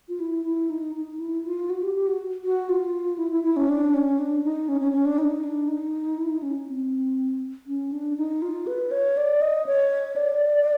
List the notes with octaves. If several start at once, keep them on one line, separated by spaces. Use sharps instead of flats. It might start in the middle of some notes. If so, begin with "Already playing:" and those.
F4
E4
E4
D#4
D#4
E4
F4
F#4
G4
G4
F#4
F#4
F4
E4
E4
E4
C#4
D4
C#4
D4
D#4
C#4
C#4
C#4
D4
D#4
D4
D#4
E4
D#4
C#4
C4
C#4
D4
D#4
F4
B4
C#5
D5
D#5
C#5
D5